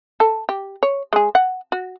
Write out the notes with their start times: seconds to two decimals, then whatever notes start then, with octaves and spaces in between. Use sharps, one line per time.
0.20 A4
0.49 G4
0.83 C#5
1.13 G#3 G#4
1.35 F#5
1.72 F#4